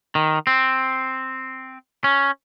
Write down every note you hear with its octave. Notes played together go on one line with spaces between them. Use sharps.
D#3
C4
C#4